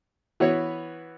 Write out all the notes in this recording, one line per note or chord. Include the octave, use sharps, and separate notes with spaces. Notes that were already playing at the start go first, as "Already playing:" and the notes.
E3 B3 F#4 C#5